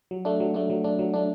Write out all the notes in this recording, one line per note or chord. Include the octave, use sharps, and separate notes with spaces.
F#3
A3 D4
F#3
A3 D4
F#3
A3 D4
F#3
A3 D4